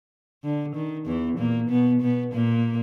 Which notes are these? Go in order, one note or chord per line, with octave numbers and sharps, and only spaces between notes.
D3
D#3
E2 E3
A#2 A#3
B2 B3
B2 B3
A#2 A#3